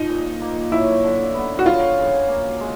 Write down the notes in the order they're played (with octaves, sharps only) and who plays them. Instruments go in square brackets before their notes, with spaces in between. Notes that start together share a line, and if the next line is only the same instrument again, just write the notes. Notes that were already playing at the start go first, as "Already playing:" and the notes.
Already playing: [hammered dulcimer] F3 [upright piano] D#4
[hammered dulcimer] A#2
A#3
[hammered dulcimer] F#3 [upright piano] E4
[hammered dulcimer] D3
B3
[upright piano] F#4
[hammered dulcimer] F#3 [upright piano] F4
[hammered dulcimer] C#3
A#3
G#3